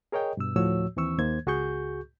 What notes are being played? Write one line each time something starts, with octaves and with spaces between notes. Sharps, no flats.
G#4 A#4 C#5 D#5 G5
G2 B2 E6
D2 A2 F3 F#4 C#5 E6
D#2 E3 C4 C#6 E6
D#2 D#3 A#3 C5 G#6
C#2 F#4 G#4 C#6 G6